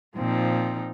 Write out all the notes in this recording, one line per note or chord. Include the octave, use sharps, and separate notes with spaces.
A#2 F3 C4 D#4